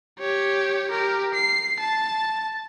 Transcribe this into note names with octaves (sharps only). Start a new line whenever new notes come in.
G4 C#5
G4 A#4
C7
A5